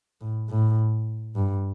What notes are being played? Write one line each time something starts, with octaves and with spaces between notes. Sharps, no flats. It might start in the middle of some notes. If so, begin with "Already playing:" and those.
A2
A2
G2